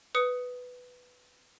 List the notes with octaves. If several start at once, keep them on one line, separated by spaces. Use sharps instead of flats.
B4 D#6 C#7